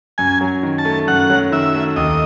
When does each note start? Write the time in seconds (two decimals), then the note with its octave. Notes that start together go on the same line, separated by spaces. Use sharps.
0.18 F#2 G#5
0.41 F#3
0.63 D#3
0.78 A5
0.85 A3
1.08 F#2 F#5
1.30 F#3
1.52 D#3 E5
1.75 A3
1.96 D#2 D#5